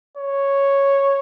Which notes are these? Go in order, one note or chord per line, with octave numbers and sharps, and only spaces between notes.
C#5